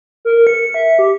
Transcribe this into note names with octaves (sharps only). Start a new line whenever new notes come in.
A#4
C#7
E5
G4